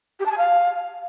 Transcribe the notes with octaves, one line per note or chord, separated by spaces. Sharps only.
G4
A5
G#5
F5